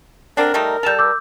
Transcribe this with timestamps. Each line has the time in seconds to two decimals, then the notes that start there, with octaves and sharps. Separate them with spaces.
0.37 D3 C4 D4 A#4
0.54 G3 A3 D#4
0.83 G3 A4 G6 E7 F7
0.99 D6 E6 G6